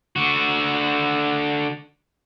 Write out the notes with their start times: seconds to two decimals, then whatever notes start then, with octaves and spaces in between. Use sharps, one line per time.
0.16 D3 F#4